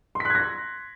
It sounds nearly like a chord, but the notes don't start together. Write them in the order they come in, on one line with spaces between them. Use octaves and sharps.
C6 B6 F#6 G#6 A#6